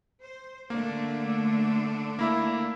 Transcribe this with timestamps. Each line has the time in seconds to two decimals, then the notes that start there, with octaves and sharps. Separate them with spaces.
0.22 C5
0.70 D3 A3 A#3 D4
2.19 A#3 E4 E5